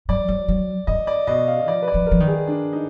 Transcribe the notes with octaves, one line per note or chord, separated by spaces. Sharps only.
F#3 D5
F#3
F#3
D3 D#5
D5
B2 D#5
F5
F3 D5
B4
D5
F3
F3 A#4
D#3
G#4
D4
D#4